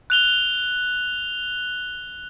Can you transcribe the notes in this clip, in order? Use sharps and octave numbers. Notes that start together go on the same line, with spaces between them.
F#6 F7 G7